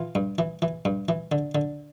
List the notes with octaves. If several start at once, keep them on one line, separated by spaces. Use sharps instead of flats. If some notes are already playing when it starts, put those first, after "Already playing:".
Already playing: E3 F4
G2
E3
E3
G2
E3
D3
D3